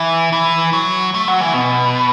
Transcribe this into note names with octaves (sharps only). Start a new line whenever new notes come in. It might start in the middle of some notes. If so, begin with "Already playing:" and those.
Already playing: E3
E3
F#3
A3
F#3
E3
B2